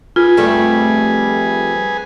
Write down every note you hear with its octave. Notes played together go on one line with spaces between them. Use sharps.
F4 G#4 B4 G#5
F2 G3 A3